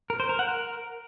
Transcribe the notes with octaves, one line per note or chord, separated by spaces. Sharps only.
A#4
C5
A#4
F#5
A#4